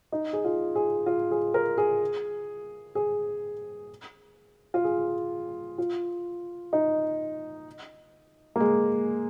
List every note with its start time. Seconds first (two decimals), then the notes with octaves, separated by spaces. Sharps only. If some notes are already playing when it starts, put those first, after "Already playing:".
0.12 D#4
0.33 G#4
0.44 F4
0.75 G#4
1.06 F4
1.31 G#4
1.54 A#4
1.78 G#4
2.95 G#4
4.74 F4
4.84 G#4
5.78 F4
6.73 D#4
8.56 A#3
8.60 G#3